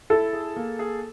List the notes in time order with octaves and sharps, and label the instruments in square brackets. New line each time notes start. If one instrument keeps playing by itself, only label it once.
[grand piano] E4 [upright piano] A4
[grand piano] G#4
A#3
G#4